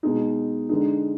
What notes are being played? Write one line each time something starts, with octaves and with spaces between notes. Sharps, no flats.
B2 G#3 D#4
D3 G#3 D#4